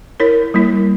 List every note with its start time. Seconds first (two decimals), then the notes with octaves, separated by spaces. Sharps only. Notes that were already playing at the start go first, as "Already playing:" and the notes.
0.20 E4 A#4 C#5
0.54 G3 A#3 E4